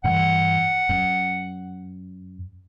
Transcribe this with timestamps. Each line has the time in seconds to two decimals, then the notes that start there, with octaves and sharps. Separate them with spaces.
0.04 G2 E3 F#5
0.89 F#2